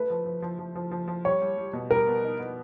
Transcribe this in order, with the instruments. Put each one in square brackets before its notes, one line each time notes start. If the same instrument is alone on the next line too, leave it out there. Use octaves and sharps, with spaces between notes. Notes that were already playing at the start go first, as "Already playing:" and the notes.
Already playing: [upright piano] A3 [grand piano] B4
[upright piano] F3
F3
F3
F3
F3
F3
F3
[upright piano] G3 [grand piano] C#5
[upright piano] G3
G3
B2
[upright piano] G3 [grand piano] A#4
[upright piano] B3
D#4
B3